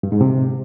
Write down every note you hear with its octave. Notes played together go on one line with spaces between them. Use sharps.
G2
G#2
C3